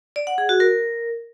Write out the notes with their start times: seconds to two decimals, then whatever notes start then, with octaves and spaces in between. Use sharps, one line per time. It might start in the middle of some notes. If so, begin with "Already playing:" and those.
0.16 D5
0.27 F#5
0.38 G#4
0.49 F#4
0.60 A#4